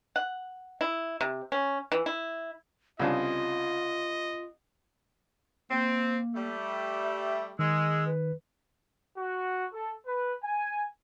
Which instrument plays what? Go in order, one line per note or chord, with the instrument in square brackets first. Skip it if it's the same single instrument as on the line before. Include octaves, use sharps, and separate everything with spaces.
[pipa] F#5
E4
C3
C#4
E3
E4
[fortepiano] C2 C#3 D4 [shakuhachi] F4 [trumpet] D#5
[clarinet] A#3 [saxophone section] C4
[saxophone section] G3 A3
[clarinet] E5
[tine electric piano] D#3 [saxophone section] G#3 [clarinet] E6
[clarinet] B4
[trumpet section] F#4
A4
B4
G#5